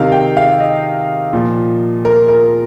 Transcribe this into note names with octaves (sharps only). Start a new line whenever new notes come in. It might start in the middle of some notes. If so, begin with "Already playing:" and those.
Already playing: C3 D#3 F5
G5
F5
D#5
A#2 F3
A#4
A#4